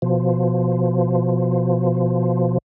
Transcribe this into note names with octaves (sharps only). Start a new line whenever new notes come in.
B2 F3